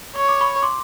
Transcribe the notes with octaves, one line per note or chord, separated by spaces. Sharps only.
C#5 C#6
D6
B5 C#6
C6 D6